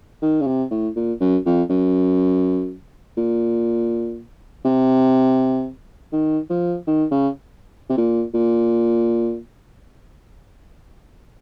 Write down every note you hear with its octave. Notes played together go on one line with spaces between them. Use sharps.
D#3
C#3
C3
A2
A#2
F#2
F2
F#2
A#2
C3
D#3
F3
D#3
C#3
C3
A#2
A#2